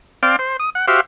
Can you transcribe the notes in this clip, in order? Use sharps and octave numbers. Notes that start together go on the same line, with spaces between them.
C4 D5 F5 G5
C5
D#6
F#5
F#4 G4 C5 E5 F5